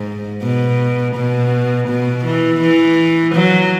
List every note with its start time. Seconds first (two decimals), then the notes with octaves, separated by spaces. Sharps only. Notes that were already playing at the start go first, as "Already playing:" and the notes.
Already playing: G#2
0.42 B2
1.16 B2
1.88 B2
2.25 E3
2.61 E3
3.35 F#3